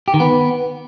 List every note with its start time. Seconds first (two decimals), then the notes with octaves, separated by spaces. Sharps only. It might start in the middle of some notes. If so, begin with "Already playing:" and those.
0.08 G4
0.14 D#3
0.20 B3